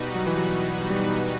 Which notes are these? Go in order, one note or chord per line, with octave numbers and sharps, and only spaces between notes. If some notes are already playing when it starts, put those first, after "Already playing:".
Already playing: B2 G3 D#4 F#4 B4
F#3
E3
F#3
G3